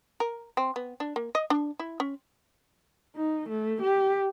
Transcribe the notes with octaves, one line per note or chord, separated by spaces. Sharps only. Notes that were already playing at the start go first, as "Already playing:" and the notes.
A#4
C4
B3
D4
A#3
D#5
D4
E4
C#4
D#4
A3
G4